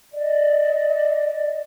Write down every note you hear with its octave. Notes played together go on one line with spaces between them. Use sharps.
D5 D#5